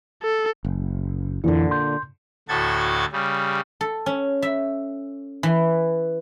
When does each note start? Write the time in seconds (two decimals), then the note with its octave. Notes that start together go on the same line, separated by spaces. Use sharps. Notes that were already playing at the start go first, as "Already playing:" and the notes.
0.22 A4
0.65 F#1
1.44 F2 A#2 D3 E3 E4
1.71 C6 G6
2.49 D2 A2 F#4 A4 G#6 A6
3.12 C#3 G3
3.81 A4
4.06 C#4
4.42 E5
5.43 E3